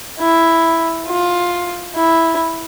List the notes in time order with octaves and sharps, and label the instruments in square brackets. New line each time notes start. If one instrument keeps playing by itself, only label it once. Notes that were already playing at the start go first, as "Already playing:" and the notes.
[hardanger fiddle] E4
F4
E4